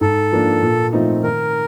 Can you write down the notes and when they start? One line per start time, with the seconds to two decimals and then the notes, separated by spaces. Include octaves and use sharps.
0.01 G#2 A4
0.32 F3 A#3 D4
0.62 A#2
0.93 F3 A3 C4 D#4
1.23 D#3 A#4